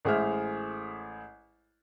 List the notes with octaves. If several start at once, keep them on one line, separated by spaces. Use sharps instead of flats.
A1 G#3 G#4 C5 E5 F6